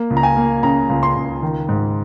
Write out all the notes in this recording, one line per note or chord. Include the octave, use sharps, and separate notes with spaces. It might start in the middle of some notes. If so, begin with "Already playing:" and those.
Already playing: A#3
C#2
A#5
G#5
A#3
C#3 A#5
C#2
C6
C#2
D#3
G#2